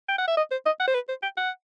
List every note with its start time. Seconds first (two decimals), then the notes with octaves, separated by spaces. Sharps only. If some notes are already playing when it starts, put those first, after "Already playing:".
0.09 G5
0.18 F#5
0.27 E5
0.37 D#5
0.51 C5
0.66 D#5
0.79 F#5
0.87 C5
0.94 B4
1.08 C5
1.22 G5
1.37 F#5